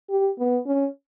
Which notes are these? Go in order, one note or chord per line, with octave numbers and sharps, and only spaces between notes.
G4
B3
C#4